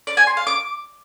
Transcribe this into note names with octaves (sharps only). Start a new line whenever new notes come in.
D5
G#5
C6
F5
D6